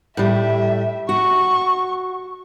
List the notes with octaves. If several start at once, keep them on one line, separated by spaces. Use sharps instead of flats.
A2 G3 E5
F#4 C#6